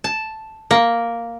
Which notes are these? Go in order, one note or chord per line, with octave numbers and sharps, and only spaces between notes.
A5
A#3